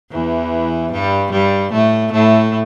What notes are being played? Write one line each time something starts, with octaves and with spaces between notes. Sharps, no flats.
E2 E3
G2 G3
G2 G3
A2 A3
A2 A3